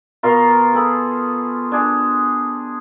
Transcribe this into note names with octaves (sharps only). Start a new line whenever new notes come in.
B2 F4 A#4
G#4 A4 B5
D4 G#4